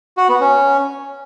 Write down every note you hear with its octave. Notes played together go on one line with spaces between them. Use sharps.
F#4
B3
C#4